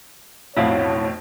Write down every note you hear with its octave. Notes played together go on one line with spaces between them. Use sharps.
B1 F2 A2 E4 C#5 F5 F#5